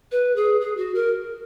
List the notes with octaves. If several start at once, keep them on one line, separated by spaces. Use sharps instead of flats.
B4
G#4
G#4
F#4
A#4